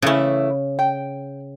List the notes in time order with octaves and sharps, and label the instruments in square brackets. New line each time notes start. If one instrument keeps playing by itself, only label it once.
[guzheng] C#3 C#4 [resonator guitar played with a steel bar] E3 A3 E4
[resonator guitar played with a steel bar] G5